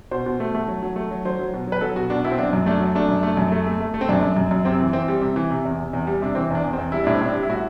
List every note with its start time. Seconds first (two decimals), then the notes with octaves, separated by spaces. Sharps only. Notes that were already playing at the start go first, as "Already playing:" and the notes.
0.11 B2 C5
0.26 B2
0.40 A3
0.55 A3
0.68 F#3
0.82 F#3
0.96 A3
1.11 F#3
1.25 F#3 C5
1.39 F#3
1.54 B2
1.67 F#3 B4
1.81 F#3 A4
1.96 B2 F#4
2.10 B2 D4
2.24 B2 E4
2.32 C4
2.38 F#3 D4
2.53 F#2
2.66 A3 D4
2.80 F#3
2.95 A3 D4
3.09 F#2
3.23 A3
3.37 F#2
3.52 A3
3.67 A3
3.80 A3
3.94 A3
4.01 C4
4.09 F#2 D4
4.23 F#2
4.37 F#2
4.51 F#2
4.65 C3 C4
4.80 E3
4.93 E3 C4
5.08 G3
5.22 C3
5.36 E3
5.50 C3
5.65 E2
5.79 C3
5.93 E2
6.07 G3
6.22 C3 D4
6.35 E3 C4
6.50 E2 D4
6.64 E2
6.73 C4
6.78 E2
6.92 G3 E4
7.04 A2 D4
7.15 C4
7.21 A2 D4
7.35 G3
7.43 E4
7.49 A2 F#4